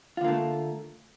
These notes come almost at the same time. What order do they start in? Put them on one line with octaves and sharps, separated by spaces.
F4 D3 A#3 A3